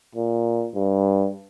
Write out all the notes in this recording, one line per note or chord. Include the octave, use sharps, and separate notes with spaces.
A#2
G2